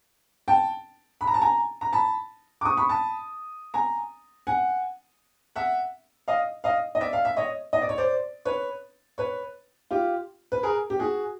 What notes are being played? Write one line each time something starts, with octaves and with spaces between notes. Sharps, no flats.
G5 A5
B5
A#5
A5
G#5 A#5
A#5
A5 B5
D6
C#6 D#6
B5 C#6
A5 B5
G#5 A#5
F#5 G#5
E5 F#5
D#5 F5
D#5 F5
D#5
D5 E5
F5
E5
C#5 D#5
D#5
D5
C#5
C5 D5
B4 C#5
B4 C#5
F4 G4
B4
G#4 A#4
G4
F#4 G#4